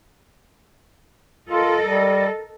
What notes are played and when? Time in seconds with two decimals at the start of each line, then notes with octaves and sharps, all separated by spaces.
1.49 F4 A4 A#4 D#5
1.81 G3